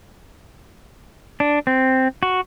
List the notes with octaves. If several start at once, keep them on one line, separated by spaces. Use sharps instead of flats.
D4
C4
F#4